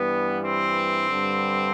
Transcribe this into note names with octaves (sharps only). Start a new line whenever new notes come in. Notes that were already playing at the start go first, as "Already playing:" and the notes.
Already playing: G2 E3 G3 B3
C4
G2 D3 G3